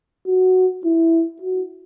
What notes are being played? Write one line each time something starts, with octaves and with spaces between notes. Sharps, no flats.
F#4
E4
F#4